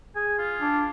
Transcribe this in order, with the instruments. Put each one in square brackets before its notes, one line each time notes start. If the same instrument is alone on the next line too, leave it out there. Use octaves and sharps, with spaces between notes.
[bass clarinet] G#4 [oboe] G#5
[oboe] F4
[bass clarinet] D4